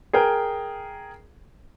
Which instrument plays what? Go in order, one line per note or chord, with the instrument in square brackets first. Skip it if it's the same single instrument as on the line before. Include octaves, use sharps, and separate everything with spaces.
[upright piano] G#4 A#4 G5